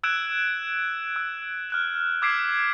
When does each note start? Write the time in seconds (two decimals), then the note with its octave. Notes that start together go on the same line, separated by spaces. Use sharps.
0.03 E6 F#6 G#6 D7 E7
1.16 E6
1.70 F6 F#6 E7
2.22 D6 E6 G#6 B6 C7 D7